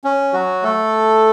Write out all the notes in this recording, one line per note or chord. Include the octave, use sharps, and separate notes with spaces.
C#4
F#3 F#4
A3 A4